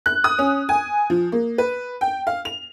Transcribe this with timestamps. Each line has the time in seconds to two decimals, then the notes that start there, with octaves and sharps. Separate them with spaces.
0.06 F#6
0.24 D#6
0.39 C#4
0.69 G#5
1.10 F3
1.32 A#3
1.58 B4
2.01 G5
2.27 F5
2.45 F7